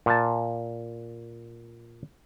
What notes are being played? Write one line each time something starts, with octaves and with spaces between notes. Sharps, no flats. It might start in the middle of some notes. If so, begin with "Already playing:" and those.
A#2 A5